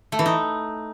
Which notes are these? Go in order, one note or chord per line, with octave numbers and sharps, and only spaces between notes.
A3
E3
D#4